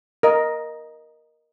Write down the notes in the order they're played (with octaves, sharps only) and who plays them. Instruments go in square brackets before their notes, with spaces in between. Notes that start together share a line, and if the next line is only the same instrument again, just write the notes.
[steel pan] A#4 D#5